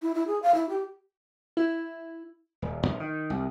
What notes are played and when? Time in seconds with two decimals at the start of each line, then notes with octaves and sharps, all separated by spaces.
0.02 E4
0.15 E4
0.27 G#4
0.42 F5
0.54 E4
0.69 G4
1.57 E4
2.62 D#1
2.86 A#1
3.00 D#3
3.30 C2